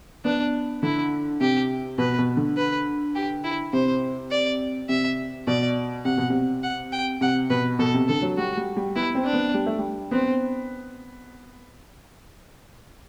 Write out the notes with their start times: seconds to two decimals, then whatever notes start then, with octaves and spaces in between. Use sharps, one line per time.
0.25 B3 D4
0.83 D3 E4
1.40 C3 G4
1.98 B2 B4
2.18 B2
2.37 D3
2.57 B4
3.15 G4
3.44 E4
3.73 C3 C5
4.31 D5
4.89 C3 E5
5.47 B2 D5
6.05 C3 F#5
6.18 B2
6.30 C3
6.63 F#5
6.92 G5
7.21 C3 F#5
7.50 B2 B4
7.79 B2 A4
7.94 C3
8.08 D3 A4
8.22 F#3
8.37 G3 F#4
8.57 G3
8.77 G3
8.96 B3 E4
9.15 C4
9.25 D4
9.34 B3
9.54 G3
9.66 A3
9.78 G3
10.11 B3 C4